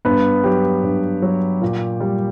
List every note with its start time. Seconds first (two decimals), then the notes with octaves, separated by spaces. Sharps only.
0.05 G2 B3 B4
0.44 F#3 G4
0.84 G2
1.22 F#3
1.62 A#2
2.01 G3